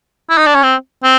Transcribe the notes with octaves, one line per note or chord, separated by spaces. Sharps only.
E4
D#4
D4
C#4
C4
C4